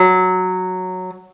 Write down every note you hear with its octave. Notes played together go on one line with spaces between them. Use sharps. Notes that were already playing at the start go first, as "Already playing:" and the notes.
Already playing: F#3